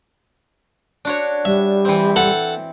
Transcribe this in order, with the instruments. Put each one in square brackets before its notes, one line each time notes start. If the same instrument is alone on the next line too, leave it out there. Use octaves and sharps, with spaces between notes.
[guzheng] D4 F#4 C#5
[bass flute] G3 [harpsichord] E5
[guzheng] E3 C4
[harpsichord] A4 F#5